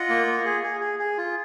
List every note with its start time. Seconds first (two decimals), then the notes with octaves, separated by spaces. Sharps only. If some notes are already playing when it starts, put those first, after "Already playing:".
Already playing: F4 D#5 F#5
0.09 A#3
0.27 A#3
0.45 G#4
0.64 G#4
0.81 G#4
0.99 G#4
1.17 F4